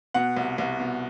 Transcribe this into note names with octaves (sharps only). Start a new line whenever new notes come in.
B2 F#5
C2
C2
B2